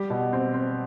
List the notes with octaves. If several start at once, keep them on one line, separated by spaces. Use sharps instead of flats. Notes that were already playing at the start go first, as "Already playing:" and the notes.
Already playing: G3 G4
B2
C4
C4